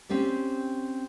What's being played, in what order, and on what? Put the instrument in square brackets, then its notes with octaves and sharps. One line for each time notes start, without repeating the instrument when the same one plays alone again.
[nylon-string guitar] C4 C#4 G4 D5